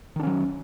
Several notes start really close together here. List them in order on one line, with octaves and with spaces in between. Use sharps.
D#3 D4 C#4 F#3